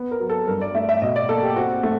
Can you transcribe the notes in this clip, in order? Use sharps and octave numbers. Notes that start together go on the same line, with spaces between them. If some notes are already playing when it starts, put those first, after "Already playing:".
Already playing: B3
A#4
F#3
A4
G2 A#4
D5
A3 E5
E5
B2 D#5
D5
A#3 A4
G4
C4 F#4
A3